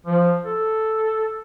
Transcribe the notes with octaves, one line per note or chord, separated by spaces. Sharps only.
F3
A4